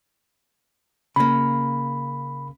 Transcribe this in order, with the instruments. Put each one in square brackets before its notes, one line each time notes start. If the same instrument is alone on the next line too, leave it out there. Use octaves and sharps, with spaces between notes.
[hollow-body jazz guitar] C#3 A#3 [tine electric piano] B5